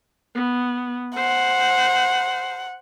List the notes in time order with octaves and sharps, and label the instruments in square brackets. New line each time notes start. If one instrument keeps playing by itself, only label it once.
[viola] B3
[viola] C5 [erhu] F#5